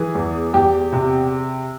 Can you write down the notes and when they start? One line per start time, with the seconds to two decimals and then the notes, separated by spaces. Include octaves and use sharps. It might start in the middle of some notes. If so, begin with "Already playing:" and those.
Already playing: E3 G#4
0.15 E2
0.54 E2 G4
0.93 C3